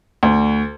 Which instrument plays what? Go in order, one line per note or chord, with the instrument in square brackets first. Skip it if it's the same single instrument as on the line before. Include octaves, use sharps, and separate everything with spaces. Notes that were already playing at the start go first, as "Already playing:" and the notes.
[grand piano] D2